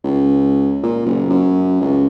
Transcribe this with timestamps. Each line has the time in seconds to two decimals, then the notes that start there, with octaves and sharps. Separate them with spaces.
0.04 C#2
0.83 A#2
1.06 F#1
1.30 F#2
1.81 C#2